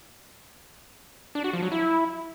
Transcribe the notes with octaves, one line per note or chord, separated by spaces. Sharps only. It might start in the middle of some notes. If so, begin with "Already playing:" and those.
D4
F#4
F3
F#3
E4